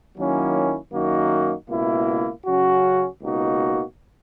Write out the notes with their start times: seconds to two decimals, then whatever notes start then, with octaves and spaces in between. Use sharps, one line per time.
0.16 D#3 F#3 A#3 C#4 E4
0.92 F#2 D#3 A#3 D#4 F#4
1.69 C#2 B2 A#3 E4
2.45 C#3 F#3 C#4 F#4
3.22 C#2 B2 A#3 D#4 F#4